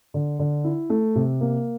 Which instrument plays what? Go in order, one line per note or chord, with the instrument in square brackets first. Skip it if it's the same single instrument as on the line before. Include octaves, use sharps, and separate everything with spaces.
[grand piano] D3
D3
E4
A3
C3
A#3